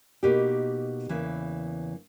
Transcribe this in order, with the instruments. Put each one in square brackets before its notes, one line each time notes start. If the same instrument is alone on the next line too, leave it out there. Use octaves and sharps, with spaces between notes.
[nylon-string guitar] B2 A#3 D#4 G4
E2 C#3 E3 A#3